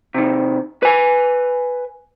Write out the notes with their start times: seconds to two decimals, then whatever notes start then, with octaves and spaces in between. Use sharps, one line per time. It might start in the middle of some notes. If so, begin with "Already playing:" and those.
0.14 C3 D#3
0.83 B4 G#5